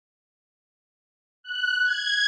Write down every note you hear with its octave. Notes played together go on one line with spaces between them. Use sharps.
F#6
G#6